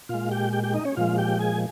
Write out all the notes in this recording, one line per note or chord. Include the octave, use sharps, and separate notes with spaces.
A#2 G#3 F4 F5
G4 G5
G4 G5
G4 G5
D#4 D#5
C#4 C#5
A#2 F3 G#3 F4 F5
G4 G5
G#4 G#5